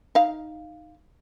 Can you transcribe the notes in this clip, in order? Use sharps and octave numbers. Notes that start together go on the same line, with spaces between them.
D#4 F5